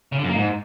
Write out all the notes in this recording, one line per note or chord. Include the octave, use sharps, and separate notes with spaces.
C#3
D3
F#2
A#3
G#2